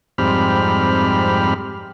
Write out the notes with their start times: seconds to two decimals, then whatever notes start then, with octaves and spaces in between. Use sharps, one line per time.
0.18 F2 G#2 G3 C4 B5 F6